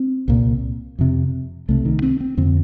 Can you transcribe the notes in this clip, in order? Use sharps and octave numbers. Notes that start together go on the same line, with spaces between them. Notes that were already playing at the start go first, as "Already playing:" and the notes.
Already playing: C4
C2 A#2
F2 C3
C2 C3 A3
D#3
C4
C4
F2 D3 C4